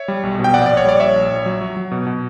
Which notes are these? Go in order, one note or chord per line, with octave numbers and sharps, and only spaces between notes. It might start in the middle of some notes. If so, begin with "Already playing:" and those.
Already playing: C#5 E5
G3
B1
B2
G5
A#1 D5 F#5
D5
A#1
C#5
G3 D5
A#1 C#5 E5
A#1
A#1
F#3
F#3
F#3
B2
B2